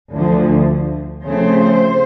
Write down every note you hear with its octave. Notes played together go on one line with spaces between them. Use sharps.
D2 D3 F3
C#3 F3 A3 C4 C5